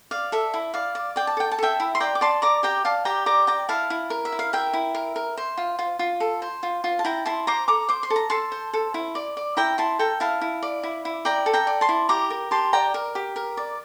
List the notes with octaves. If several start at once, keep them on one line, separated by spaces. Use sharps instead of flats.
D5 F5
A4 E5
E4
D5 F5
D5
D5 G5
A5
A4 G5
A5
A4 E5 G5
E4
C6
D5 G5 A#5
D6
D5 A5 C6
D5 A#5 D6
G4 G5 A#5
D5 F5 A5
G4 G5 A#5
D5 A#5 D6
D5 G5 A#5
E4 F5 A5
E4
A#4
E5
E4
F5
A#4 E5 G5
E4
A#4
A#4
C5
F4
F4
F4
A4
C5
F4
F4
A5
E4 G5 A#5
E4 A5 C6
C5 A#5 D6
A4 A#5 D6
C5 D6
C6
A4
A#5
A4 A5 C6
C5
A4
E4
D5
D5
E4 G5 A#5
E4 A5 C6
A4 G5 A#5
E4 F5 A5
E4
D5
E4
E4
D5 G5 A#5
A4
G5 A#5
D5
A5 C6
E4
G4 A#5 D6
A#4
G4 A5 C6
D5 G5 A#5
A#4
G4
A#4
D5